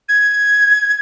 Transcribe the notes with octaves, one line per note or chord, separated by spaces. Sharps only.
G#6